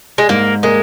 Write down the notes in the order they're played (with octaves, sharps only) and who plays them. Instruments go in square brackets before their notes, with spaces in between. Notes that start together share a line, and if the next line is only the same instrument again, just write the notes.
[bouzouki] G#3
[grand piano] G#2 [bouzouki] A#3
[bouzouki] G#3 [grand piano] A#3